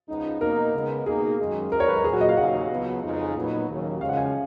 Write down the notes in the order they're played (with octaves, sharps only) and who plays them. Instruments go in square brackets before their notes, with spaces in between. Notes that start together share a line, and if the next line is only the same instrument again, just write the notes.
[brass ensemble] C#2 C#3 F3 B3 D#4
[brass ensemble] B2 A#3 D#4 [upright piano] A#4
[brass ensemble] C#3 G#3 B3
[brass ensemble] B2 A#3 D#4 [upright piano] G#4
[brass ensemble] F#2 D#3 G#3
[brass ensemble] F#2 D#3 G#3 D#4 [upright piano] A#4
[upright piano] C#5
B4
A#4
[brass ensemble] A#2 F#3 C#4 [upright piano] G#4
[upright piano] F#4
D#5
F5
[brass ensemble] D#2 C#3 F#3 [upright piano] F#5
[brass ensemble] C#2 B2 F#3 B3
F2 C#3 G#3 D#4
A#2 F#3 B3 D#4
D#2 C#3 F#3
[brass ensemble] C#3 F3 G#3 C#4 [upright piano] F5
[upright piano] F#5
G#5
F5